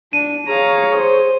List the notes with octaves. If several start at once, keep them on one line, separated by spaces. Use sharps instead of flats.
D4 D#7
G#4 C#5 F5 A#5
C5